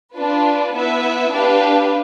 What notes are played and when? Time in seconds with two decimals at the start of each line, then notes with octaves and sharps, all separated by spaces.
0.14 D4 F4 B4
0.72 B3 E4 B4 E5
1.31 D4 G4 B4 F5